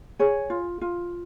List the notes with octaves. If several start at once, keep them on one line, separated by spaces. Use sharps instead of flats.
G#4 C#5
F4
F4